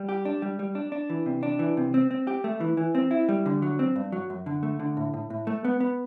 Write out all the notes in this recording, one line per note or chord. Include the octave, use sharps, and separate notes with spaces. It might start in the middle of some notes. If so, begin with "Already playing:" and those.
Already playing: G3
G4
D4
G3
G3
D4
D4
E3
C3
D4
E3
C3
C4
C4
G4
A3
E3
E3
C4
E4
G3
D3
F#3
C4
G2
F#3
F#2
D3
A3
D3
A2
A2
A2
A3
B3
B3